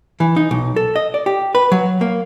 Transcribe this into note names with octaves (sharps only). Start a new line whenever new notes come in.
E3
D#4
B1
A4
D#5
D5
G4
B4
F#3
A#3